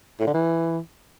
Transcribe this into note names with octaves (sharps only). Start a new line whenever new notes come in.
A2
D3
E3